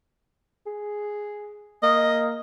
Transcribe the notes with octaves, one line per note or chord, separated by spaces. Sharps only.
G#4
A#3 D#5